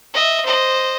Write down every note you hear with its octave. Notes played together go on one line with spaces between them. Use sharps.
D#5 E5
C5 D#5